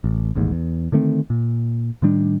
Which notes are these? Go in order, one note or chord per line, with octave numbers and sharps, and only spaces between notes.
A1
E1 A1 D#2 G#2
E2
D3 D#3 A3 C4
A#2
A2 D#3 G3 D4